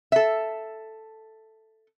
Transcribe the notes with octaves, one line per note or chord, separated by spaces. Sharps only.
A4 E5